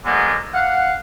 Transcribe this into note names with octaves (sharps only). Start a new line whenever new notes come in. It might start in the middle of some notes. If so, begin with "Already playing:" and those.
D3 F#3 G#3 A#3 B3
F5 F#5